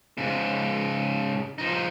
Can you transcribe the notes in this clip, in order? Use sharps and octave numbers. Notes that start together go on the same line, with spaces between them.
G#2 C#3
F3 D#4